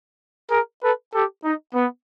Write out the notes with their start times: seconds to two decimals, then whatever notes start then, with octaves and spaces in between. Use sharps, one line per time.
0.50 G#4 A#4
0.81 A4 B4
1.13 G4 A4
1.44 D#4
1.74 B3